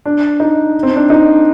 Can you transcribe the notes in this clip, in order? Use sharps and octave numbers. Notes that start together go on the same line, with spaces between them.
D4
D#4
C4
D4
D#4